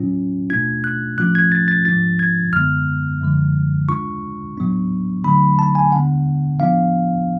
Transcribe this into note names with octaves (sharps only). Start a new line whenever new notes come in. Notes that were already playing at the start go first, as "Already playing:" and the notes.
Already playing: A2 F#3 C#4 F4
B2 A3 D4 F4 G#6
F#6
A2 F3 A3 C#4 F4 F#6
G#6
A6
A6
G#2 F3 G#3 D4 F4 A6
G#6
F#2 D3 G#3 B3 F6
F#2 D3 F3 G#3
C#3 G#3 D4 F4 C#6
A2 F#3 B3 D4
D3 F#3 A3 D4 B5
A5
G#5
D3 G#3 B3 D4 F#5
A2 F3 B3 D4 F4 F5